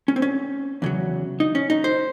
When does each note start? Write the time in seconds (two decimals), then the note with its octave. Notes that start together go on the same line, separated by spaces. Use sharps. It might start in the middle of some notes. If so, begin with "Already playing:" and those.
0.08 C#4
0.16 C4
0.22 C#4
0.82 E2 C#3 F#3
1.40 D#4
1.55 C#4
1.70 D#4
1.84 C5